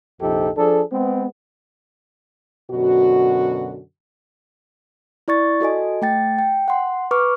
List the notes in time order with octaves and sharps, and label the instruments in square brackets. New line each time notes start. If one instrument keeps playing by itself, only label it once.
[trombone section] A#1 F2 C3 D#4 G4 A4
F3 D4 G#4 A4
G#3 B3 C4
[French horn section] F#2 B2 D3 F#4
[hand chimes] E4 D5 C#6 A6
F#4 A4 D#5 G#5
A3 G5 A6
G5
F#5 C6
B4 C#6 D6 F6